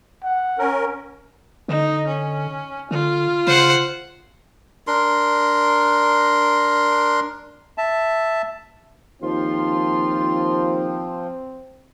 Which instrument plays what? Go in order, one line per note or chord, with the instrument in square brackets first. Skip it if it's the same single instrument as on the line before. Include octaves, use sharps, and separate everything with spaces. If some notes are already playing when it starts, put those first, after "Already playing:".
[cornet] F#5
[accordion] C#4 A#4
[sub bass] D3 [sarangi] D#4
[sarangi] C#4
[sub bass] D3 [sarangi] F4
[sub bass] C#3 [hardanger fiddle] C5 F#5
[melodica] D4 A#4 C6
[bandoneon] E5 A5
[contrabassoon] D#2 [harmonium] F3 [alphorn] C4 [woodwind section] F4 C6